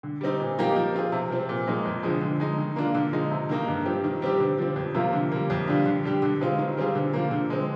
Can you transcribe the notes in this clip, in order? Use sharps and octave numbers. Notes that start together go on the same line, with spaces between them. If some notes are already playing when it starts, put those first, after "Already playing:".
D3
G3 C4 D#4
A#2
F3 A#3 D#4 G4
F3
C4 F4 G#4
C3
F3 C4
A#2
F3 G#3 C4 D#4
F2
D3 F3 G#3
D3
G#3 D#4
D#3
A#3 D4 F4
D3
F3 G#3 D#4
C3
D#3 A#3 D#4
G2
F3 C4 G4
D#3
G3 C4 G4
D3
F3 C4
F2
C3 F3 A#3 F4
D3
G3 A#3
F2
D3 G3 D4 F4
D3
G3 D4 G4
D3
G#3 C4 F4
D#3
G3 C4 F4 G#4
D3
F3 A#3
D3
G#3 C4